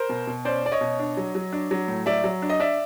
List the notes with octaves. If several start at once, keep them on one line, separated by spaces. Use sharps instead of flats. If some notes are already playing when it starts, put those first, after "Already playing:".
Already playing: A#4 C5
B2
B2
C#4 C5 D5
C#4 D5
C#5 D#5
B2
D4
F#3
F#3
D4
F#3
A2
F#3 D5 E5
F#3
D4
D#5
D4 D5 E5